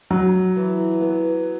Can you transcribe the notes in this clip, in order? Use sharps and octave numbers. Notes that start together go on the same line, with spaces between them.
F#3 D#4
E3
B3